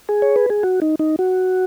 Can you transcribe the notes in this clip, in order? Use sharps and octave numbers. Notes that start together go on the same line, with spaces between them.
G#4
C#5
B4
G#4
F#4
D#4
D#4
F#4